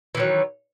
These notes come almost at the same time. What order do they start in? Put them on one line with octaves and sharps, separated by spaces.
E3 D#3 F#3